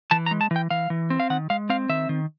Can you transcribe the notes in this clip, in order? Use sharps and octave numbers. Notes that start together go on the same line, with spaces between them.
E3 A5
A#5
G#3
A5
E3
G5
E3 F5
E3
C4
F5
D#3 F#5
G#3 F5
C4 F5
D#3 E5
D#3